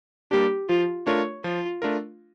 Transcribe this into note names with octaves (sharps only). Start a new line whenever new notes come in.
G3 A#3 D4 G4
F3 F4
A3 D4 F4 A#4 C#5
F3 F4
A3 D4 F4 A#4